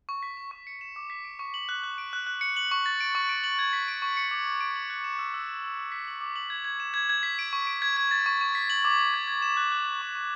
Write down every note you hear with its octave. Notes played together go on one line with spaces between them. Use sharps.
C#6
B6
E7
C#6
C#7
E7
D6
B6
D7
C#6
F#7
F#6
F#6
D7
F#6
F#6
C#7
F#7
C#6
A6
D7
C#6
D7
F#7
G#6
B6
D7
C#6
C#7
D6
D6
D7
F#7
F#6
E7
E6
E6
E7
E6
E6
B6
F#7
D6
F#7
G#6
G#6
E7
G#6
G#6
B6
D7
C#6
D7
G#6
G#6
A6
C#6
C#6
B6
F#7
D6
F#7
G#6
G#6
E7
F#6
F#6
A6
C#6
C#6